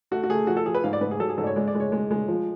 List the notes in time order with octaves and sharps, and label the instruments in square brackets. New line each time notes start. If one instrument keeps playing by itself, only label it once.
[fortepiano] A3 [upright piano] F#4
[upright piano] F#4
[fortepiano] A3 [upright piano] G#4
[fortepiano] F3 [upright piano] F#4
[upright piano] A4
[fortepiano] F3 [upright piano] G#4
[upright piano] B4
[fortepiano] G#2 [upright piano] F5
[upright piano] D5
[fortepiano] G#2 [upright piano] B4
[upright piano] G#4
[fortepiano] F#3 [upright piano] A4
[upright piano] G#4
[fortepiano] G#2 [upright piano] A4
[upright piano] D5
C#5
[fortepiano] G#3 [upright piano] D5
[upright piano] D5
[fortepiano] G#3
[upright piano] C#5
[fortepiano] G#3
G#3
F3